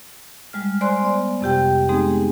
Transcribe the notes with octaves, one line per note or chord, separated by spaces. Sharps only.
G3 G#3 F6
C5 D5 G#5 C6 F#6
B3 D5
F2 C3 G4 G5
G#3 B3 C4 D#4 G4 G#4